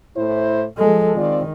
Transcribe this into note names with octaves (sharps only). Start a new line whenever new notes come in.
A2 E4 C5
F3 G#3 A4
D#3 C4 F4 D5